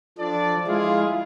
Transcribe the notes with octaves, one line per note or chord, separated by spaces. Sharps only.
F3 D4 A4 D5
G#3 E4 F4 G#4